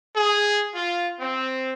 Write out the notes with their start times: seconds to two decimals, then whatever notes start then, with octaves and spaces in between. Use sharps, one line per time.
0.15 G#4
0.75 F4
1.20 C4